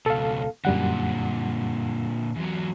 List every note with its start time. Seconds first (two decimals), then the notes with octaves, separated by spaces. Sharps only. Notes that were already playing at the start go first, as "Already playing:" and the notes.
0.06 C#2 B2 A4 F5
0.65 F#2 A#2 D3 G3 F#5
2.36 E2 F#3